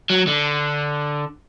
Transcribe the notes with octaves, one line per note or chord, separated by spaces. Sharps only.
F#3
D3